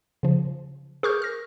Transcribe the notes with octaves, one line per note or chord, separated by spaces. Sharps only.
C#3 F3
G#4 A#4 C#6 D6 F6 G6
F6 A#6